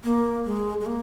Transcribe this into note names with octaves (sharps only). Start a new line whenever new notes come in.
A#3
G#3
G#3
A#3